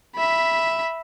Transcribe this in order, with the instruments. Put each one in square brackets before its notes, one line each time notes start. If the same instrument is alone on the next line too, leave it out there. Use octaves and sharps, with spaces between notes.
[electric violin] E5 B5